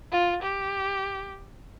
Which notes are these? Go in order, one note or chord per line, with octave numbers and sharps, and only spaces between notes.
F4
G4